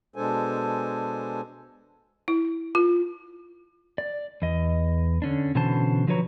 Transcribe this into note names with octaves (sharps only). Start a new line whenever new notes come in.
B2 G#3 D4 A4 C5 G#5
E4
F4
D5
E2 D#5
D3 C#4 D4
B2 D3 E3 C#4 C5 A5
D3 F3 F#3 B4 C#5 A#5